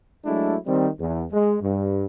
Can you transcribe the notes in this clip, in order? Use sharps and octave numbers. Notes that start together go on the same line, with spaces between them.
F#3 G#3 A3 D4 E4
D#3 G3 C4
E2
G#3
G2